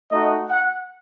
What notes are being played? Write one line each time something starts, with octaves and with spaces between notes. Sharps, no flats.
A3 D#4 F#4 D#5
F#5